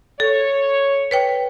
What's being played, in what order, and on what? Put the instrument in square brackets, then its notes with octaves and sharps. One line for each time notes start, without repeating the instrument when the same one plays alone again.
[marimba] A4 [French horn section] C#5
[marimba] B4 C#5 G5